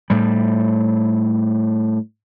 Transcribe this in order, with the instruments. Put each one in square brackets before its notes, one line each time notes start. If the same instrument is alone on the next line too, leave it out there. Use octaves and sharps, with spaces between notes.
[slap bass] A2 G3